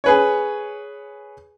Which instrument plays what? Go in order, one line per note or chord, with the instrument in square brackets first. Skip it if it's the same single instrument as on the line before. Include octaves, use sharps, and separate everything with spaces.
[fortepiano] G#4 B4 C#5